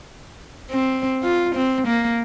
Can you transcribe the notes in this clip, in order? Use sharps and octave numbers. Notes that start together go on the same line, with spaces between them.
C4
F4
C4
A#3